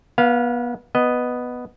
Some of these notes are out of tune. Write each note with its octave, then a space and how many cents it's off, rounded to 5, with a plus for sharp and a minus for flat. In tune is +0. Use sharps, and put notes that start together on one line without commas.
B3 -30 F5 +0
B3 +0 D#5 -5